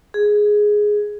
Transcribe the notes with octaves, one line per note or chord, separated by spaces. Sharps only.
G#4